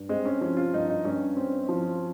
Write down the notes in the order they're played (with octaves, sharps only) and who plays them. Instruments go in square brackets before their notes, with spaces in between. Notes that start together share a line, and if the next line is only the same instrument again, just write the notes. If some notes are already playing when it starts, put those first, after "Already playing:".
Already playing: [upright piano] G2
[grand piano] G#3 [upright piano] C4
[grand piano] C#4
[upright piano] F3 [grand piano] C#4
[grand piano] F4
[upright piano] G2 [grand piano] D#4
[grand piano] D#4
[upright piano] G2 [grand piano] C#4
[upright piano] C4
F3